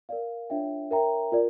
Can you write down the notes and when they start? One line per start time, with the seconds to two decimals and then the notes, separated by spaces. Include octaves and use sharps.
0.09 A#4 D5 F5
0.50 D4 F4 C#5 E5 G5
0.91 A#4 C#5 E5 G5 A#5
1.32 F4 A#4 D5